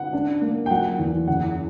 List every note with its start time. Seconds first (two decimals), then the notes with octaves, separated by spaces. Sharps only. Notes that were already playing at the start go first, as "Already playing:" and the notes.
Already playing: F#5
0.13 D4
0.42 A#3
0.66 G5
0.70 F#3 F#5
0.99 E2
1.28 F#1 F#5